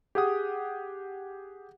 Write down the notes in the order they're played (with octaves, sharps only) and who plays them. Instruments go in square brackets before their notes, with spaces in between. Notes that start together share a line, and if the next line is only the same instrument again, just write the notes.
[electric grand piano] G4 G#4 F#5 D#6